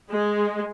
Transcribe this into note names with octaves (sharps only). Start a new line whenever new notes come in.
G#3